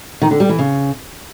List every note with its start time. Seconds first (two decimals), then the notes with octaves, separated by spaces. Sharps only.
0.22 D#3
0.31 D3
0.40 G3
0.49 E3
0.59 C#3